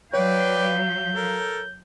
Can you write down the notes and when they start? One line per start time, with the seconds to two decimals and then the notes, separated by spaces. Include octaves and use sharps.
0.14 F#3 B4 C#5 D5 F5 G5 G6
1.15 A4 A#4